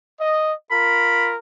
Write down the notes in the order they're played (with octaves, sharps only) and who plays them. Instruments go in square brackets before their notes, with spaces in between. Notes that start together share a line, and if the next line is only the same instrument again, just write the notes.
[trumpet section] D#5
[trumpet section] F4 A#4 [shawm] B5